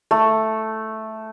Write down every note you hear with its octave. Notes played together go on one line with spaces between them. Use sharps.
A3